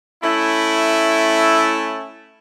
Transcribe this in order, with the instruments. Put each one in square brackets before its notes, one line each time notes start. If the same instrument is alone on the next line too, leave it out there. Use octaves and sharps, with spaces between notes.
[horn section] A3 C#4 E4